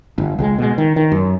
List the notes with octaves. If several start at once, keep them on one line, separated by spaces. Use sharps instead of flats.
G1
C#2 G3 G#3
B2 G#3
D#3
D#3
F#2